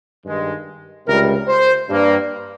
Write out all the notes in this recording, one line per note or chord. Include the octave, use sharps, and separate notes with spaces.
G2 D#3 G#3
C#2 C3 G3 A#4
C5
G2 G3 A#3